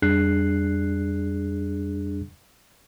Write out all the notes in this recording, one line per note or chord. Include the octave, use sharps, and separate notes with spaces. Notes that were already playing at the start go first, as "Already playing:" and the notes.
F2 G3 D4 G#4 F#6 C7